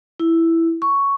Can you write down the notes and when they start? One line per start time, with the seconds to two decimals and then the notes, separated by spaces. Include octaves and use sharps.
0.20 E4
0.82 C#6